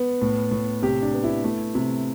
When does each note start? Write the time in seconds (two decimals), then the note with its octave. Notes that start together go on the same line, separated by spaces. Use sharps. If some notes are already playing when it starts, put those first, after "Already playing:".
Already playing: B3
0.22 A2
0.51 A2
0.82 C3 G4
1.02 D4
1.13 B3
1.24 E4
1.44 A3
1.75 C3